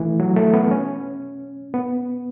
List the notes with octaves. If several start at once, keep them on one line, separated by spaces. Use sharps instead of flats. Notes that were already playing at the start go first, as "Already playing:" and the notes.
Already playing: E3 A3
F#3
A3
B3
C#4
B3